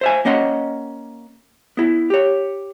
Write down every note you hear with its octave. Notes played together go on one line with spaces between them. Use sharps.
C5 E5 G#5
A#3 C#4 D#5 F#5 C6
B3 E4
G4 C#5